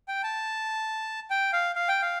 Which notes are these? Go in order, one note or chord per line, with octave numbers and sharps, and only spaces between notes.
G5
A5
G5
F5
F5
G5
F5